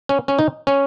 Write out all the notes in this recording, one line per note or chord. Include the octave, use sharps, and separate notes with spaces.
C#4
C#4
D#4
C#4